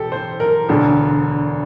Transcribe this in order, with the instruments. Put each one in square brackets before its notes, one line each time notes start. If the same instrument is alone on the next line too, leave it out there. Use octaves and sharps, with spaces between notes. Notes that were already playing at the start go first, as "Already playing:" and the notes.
Already playing: [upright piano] E1 G4 A4
C5
A#4
E1 D2 D3 A4